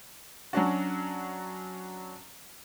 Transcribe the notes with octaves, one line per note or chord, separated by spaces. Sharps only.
F#3 C#4 D4 F#4